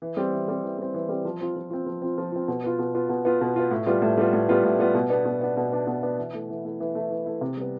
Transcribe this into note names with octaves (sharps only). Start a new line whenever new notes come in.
E3
G3 C4
E3
G3 C4
E3
G3 C4
E3
G3 C4
F3
C4 F4
F3
C4 F4
F3
C4 F4
F3
C4 F4
B2
B3 F4
B2
B3 F4
B2
B3 F4
B2
B3 F4
A2
G3 B3 F4
A2
G3 B3 F4
A2
G3 B3 F4
A2
G3 B3 F4
B2
B3 D4
B2
B3 D4
B2
B3 D4
B2
B3 D4
E3
A3 E4
E3
A3 E4
E3
A3 E4
E3
A3 E4
C3
G3 B3